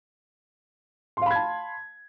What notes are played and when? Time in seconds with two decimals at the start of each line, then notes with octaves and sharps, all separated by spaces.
1.17 C6
1.22 F5
1.26 B5
1.31 G#6
1.35 A5